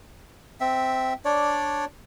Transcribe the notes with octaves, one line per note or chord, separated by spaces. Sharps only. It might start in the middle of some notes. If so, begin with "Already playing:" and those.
C4 E5
D4 C#5 D5